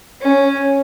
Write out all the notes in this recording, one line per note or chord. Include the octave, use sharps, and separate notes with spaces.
C#4